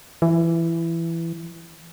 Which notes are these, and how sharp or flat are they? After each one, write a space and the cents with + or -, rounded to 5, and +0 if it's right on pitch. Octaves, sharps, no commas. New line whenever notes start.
E3 +15